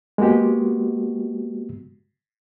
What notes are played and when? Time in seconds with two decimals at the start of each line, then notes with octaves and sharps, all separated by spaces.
0.18 G#3 A#3 B3 F#4 G4